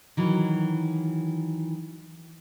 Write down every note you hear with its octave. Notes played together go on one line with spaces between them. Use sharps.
D#3 E3 F#3